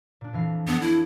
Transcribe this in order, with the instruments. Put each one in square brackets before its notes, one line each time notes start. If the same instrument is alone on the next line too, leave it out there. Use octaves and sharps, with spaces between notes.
[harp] A#2 D4
F2 E3 F5
[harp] F2 D4 E6 [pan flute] B3
[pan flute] E4